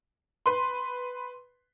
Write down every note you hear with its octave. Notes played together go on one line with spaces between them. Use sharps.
B4 C6